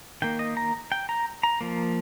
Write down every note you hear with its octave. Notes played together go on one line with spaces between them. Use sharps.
D#3 A#3 G5
D#5
A#5
G5
A#5
A#5
F3 A#3